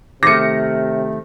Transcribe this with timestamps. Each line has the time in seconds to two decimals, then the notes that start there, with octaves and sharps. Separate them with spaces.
0.23 C3 D#3 A3 D6 A#6 C#7